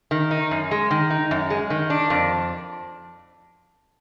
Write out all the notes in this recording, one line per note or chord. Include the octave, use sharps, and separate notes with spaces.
D#3
D#4
F#2
G#3
D#3
D#4
F#2
G#3
D#3
D4
F2